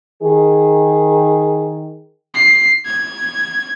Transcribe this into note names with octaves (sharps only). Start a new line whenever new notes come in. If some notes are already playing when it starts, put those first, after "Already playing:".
D#3 G#4
C7
G#6